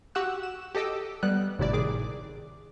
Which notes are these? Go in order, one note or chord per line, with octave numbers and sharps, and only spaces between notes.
F#4 G4 F#5 E6 F#6
E7
G4 A4 D#5 D6 E6
G3 B3 F#6
G#1 A2 C3 E4 D5
D#3 G#4 D6